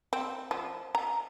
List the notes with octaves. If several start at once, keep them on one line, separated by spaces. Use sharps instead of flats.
C4
F3
A#5